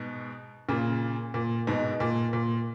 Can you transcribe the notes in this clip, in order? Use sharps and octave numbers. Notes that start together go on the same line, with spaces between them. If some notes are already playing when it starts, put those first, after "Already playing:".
Already playing: G#2 B2
A#2 C#3
A#2
G#2 B2
A#2
A#2